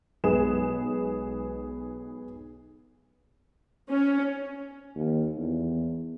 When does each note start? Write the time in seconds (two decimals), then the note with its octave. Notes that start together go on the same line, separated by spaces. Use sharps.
0.24 B1 G#3 B3 G#4 E7
3.89 C#4
4.95 D#2
5.37 E2